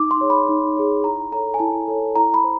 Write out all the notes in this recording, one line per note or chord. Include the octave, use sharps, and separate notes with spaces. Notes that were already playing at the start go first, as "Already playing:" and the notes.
Already playing: D#4 D6
C6
G#4 C#5
B5
D#4
G#4 C#5
E4 A#5
A4 C#5 A#5
G#5
E4 A5
A4 C#5
E4 A#5
B5
C5